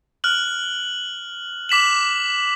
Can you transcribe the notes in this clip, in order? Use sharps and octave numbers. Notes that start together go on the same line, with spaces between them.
F6 F#6 F#7
D6 B6 E7 F#7